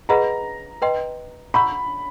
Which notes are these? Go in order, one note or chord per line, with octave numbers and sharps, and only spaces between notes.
G#4 B4 D#5 F#5 A#5 B5
B4 D#5 G5 C6
F#5 A#5 B5 C#6 E6 G6